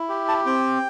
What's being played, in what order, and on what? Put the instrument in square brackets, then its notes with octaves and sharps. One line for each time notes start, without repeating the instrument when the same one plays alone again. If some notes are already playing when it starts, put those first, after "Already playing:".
Already playing: [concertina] E4
G4
A5
C4 G5